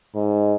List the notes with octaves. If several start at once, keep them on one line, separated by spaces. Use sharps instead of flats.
G#2